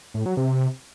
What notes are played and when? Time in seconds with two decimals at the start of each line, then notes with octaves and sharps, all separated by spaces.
0.14 A2
0.26 F#3
0.37 C3